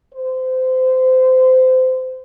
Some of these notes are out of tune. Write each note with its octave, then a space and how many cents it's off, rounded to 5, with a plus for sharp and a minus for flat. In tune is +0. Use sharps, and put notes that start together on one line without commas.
C5 -25